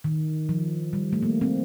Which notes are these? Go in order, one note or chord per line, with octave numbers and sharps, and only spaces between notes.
D#3
F3
G3
A3
A#3
C4